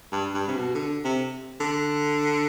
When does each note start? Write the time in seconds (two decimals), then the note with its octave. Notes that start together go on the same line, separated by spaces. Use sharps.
0.12 G2
0.34 G2
0.48 C3
0.55 B2
0.75 D3
1.05 C3
1.60 D3